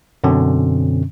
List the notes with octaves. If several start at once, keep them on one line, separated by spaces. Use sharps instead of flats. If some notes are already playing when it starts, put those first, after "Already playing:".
F#2 B2 D3 C4 C#4